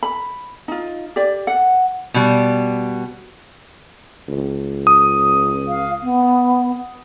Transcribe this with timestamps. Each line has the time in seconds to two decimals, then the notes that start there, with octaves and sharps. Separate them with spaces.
0.03 B5
0.68 D#4 F4
1.16 G4 D5
1.47 F#5
2.14 B2 G3
4.29 C#2
4.87 D#6
5.68 F5
6.03 B3